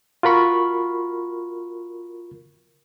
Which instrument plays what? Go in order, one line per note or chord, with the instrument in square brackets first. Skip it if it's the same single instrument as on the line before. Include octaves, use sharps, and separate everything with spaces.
[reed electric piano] F4 F#4 A#4 B5 C#6